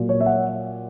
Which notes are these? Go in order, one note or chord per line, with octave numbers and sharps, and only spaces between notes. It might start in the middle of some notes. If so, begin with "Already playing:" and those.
Already playing: A#2 F#3 A#3
C#5
E5
F#5